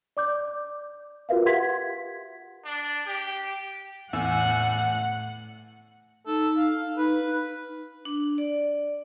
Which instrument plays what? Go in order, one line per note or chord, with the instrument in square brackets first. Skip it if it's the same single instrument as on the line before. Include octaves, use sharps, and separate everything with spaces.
[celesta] D5 D6 G6
F4 F#4 A#4 B4 E5 F5
G4 F#5 C6 G#6 B6
[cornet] D4
G4
[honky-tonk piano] E2 E6 [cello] A2 F#5
[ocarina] D#4 [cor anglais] A4
[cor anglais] F5
[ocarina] D#4 [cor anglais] B4
[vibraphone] D4
D5